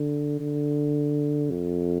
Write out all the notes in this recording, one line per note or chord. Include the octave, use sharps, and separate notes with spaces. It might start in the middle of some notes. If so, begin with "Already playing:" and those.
Already playing: D3
D3
F2